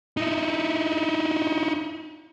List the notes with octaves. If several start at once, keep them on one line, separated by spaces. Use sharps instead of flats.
D#4 E4